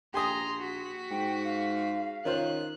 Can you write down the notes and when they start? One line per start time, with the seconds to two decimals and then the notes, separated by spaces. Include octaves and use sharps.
0.14 A#1 G4 G#5 A#5 C6 D#6
0.59 F#4 B6
1.11 G#2 G5
1.45 F5
2.25 D#3 C#4 F4 C5 F#6